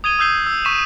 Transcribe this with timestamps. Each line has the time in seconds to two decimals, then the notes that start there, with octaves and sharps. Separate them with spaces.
0.04 D#6 G#6 D#7 G7
0.19 D#6 E6 G6 C7 G7
0.47 E6
0.65 C#6 B6 D#7 E7